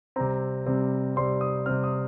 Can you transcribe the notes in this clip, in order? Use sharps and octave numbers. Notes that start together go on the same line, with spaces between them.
C3 G3 C4 A#5
C3 G3 C4
C3 G3 C4 C6
D#6
C3 G3 C4 F6
D#6